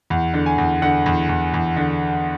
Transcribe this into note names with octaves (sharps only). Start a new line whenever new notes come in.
E2
D3
G#5
E2
D3 F#5
E2
E2
E2
D3